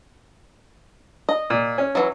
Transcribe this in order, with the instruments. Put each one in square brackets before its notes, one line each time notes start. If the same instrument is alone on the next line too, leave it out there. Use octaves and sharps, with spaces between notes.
[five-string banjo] D#5
[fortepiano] A#2
C#4
[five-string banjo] E3 F#3